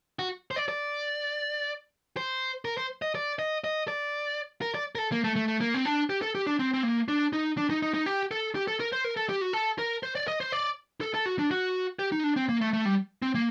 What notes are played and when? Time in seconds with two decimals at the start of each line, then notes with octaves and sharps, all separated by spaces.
0.19 F#4
0.51 C5
0.56 D5
0.69 D5
2.17 C5
2.65 A#4
2.77 C5
3.02 D#5
3.15 D5
3.39 D#5
3.64 D#5
3.88 D5
4.61 A#4
4.75 D5
4.95 A#4
4.98 A4
5.12 A#3
5.24 A3
5.36 A3
5.48 A3
5.61 A#3
5.74 C4
5.85 D4
6.10 G4
6.22 A4
6.35 G4
6.47 D4
6.59 C4
6.74 C4
6.83 A#3
7.08 D4
7.33 D#4
7.57 D4
7.70 D#4
7.82 D#4
7.94 D#4
8.06 G4
8.31 A4
8.55 G4
8.68 A4
8.80 A#4
8.92 C5
9.04 A#4
9.17 A4
9.29 G4
9.41 F#4
9.53 A4
9.79 A#4
10.03 C5
10.15 D5
10.28 D#5
10.40 C5
10.52 D5
11.01 A4
11.14 A4
11.26 F#4
11.39 D4
11.51 F#4
11.99 G4
12.12 D#4
12.24 D4
12.36 C4
12.49 A#3
12.61 A3
12.73 A3
12.85 G3
13.22 C4
13.35 A#3